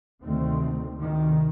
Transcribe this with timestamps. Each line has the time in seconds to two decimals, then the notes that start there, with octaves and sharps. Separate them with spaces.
0.24 D2 C3 D#3 A3 C4
0.96 D2 C3 D#3